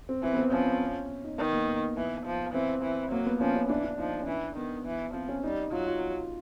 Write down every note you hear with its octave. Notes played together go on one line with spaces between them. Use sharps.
C4
E3 C4
B3
C4
F3 C#4
D#4
D#3 B3
A#3
B3
E3
F3
E3 C4
E3
F#3 A#3
B3
F3 C#4
C#4
E3 D4
D4
F3 D#4
D#4
C#4
E3 D4
D#3 B3
E3
F3 C4
C#4
G3 D#4
F#3 F4
F4